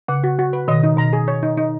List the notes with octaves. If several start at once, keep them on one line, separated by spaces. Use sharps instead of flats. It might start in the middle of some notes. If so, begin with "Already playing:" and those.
C#3 F#5
F#4
F#4
B4
B2 D#3 D#5
D#4
B2 A#5
G#4
C#5
D#4
D#4